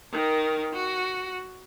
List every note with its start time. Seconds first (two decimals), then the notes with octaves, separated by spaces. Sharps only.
0.12 D#3 A#4
0.73 F#4